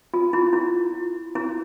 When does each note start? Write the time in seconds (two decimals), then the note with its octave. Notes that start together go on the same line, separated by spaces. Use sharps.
0.14 F4
0.33 E4
0.53 E4
1.35 E4